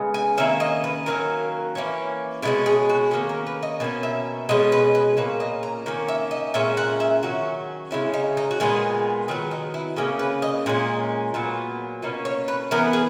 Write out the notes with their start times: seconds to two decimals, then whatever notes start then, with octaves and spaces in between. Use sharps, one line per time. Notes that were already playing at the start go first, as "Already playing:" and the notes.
Already playing: C#3 G#3 B3
0.14 G#5
0.38 D#3 A#3 C#4 E5
0.60 D#5
0.84 B4
1.06 D#3 F#3 A#3 C#4 A#4
1.75 E3 A#3 C#4
2.42 B2 G#3 C#4 E4
2.66 G#4
2.89 F#4
3.11 D#3 A#3 C#4 G#4
3.29 A#4
3.47 B4
3.63 D#5
3.80 B2 A#3 C#4 G#5
4.03 E5
4.49 B2 G#3 C#4 D#5
4.72 B4
4.95 B4
5.17 A#2 A#3 C#4 B4
5.40 D#5
5.63 A#5
5.86 D#3 A#3 C#4
6.08 E5
6.31 D#5
6.54 A#2 G#3 C#4 E5
6.77 F#5
7.00 E5
7.23 D#3 F#3 C#4 F#4
7.91 C#3 G#3 C#4 E4
8.14 D#4
8.37 D#4
8.51 F#4
8.60 A#2 G#3 B3 G#4
9.28 D#3 F#3 B3 G#4
9.51 D#4
9.74 E4
9.96 C#3 E3 A#3 C#4 G#4
10.19 B4
10.42 D#5
10.66 A#2 G#3 C#4
11.34 A#2 F#3 B3
12.02 B2 A#3 C#4 D#5
12.25 C#5
12.48 B4
12.71 E3 B3 A#4
12.93 G#4